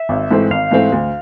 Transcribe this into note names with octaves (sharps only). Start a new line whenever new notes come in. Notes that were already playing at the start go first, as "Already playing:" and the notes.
Already playing: E5
G#1
G#2 E3 A3 C4
G#1 F5
G#2 E3 A3 C4
D2